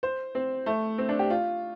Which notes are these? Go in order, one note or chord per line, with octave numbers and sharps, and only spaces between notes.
C5
C4
A3
C4
D4
G4
F4